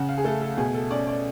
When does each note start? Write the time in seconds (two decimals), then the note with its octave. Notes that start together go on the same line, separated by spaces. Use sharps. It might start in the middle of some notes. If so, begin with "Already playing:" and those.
Already playing: C#3 F#5
0.09 F5
0.18 G#4
0.24 A3 A4
0.42 A4
0.57 B2 G#4
0.74 A4
0.90 C#4 D5
1.07 D5